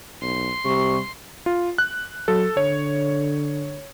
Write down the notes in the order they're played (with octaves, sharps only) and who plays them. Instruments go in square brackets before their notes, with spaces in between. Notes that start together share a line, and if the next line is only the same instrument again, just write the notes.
[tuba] B1 [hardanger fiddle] C6
[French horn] C3 [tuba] G3 [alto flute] C#6
[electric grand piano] F4
F#6
[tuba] F#3 [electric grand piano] A4
[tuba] D3 [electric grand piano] C#5